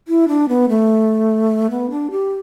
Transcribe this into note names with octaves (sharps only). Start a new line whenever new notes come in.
E4
D4
B3
A3
B3
D4
G4